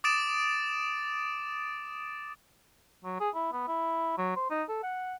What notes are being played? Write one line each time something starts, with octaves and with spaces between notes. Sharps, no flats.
D6 D#6 A6 D7 E7
F#3
G#4
E4
B3
E4
F#3
C5
D#4
A4
F#5